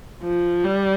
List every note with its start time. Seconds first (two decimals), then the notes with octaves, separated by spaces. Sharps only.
0.22 F3
0.64 G3